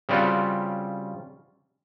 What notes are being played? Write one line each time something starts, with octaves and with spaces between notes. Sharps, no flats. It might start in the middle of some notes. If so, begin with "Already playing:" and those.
C#3 G3 C4 F4 F#4